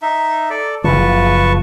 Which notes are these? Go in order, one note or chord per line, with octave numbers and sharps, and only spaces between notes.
D#4 E5
A4 D5
F#1 C#3 F3 B4 A5 C#6